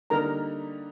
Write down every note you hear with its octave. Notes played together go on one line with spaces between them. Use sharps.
D3 G3 A#3 D#4 A#4 A#5